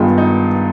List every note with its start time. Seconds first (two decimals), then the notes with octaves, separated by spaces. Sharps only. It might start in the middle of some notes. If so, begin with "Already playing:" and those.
Already playing: G2 D#3 G#3 B3 F4
0.18 D#4